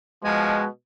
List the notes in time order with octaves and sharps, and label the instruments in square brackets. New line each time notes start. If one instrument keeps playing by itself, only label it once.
[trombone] B2 [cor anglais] F3 [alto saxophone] G#3